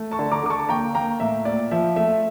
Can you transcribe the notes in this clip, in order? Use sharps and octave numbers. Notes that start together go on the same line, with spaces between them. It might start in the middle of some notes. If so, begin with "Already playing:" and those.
Already playing: A3
A5 C#6
D3
A#5 D6
D3 D6
A5 C#6
A#3 G5 A#5
A#3 G5 A#5
A2 E5
A#2 D5
F3 E5
A3 E5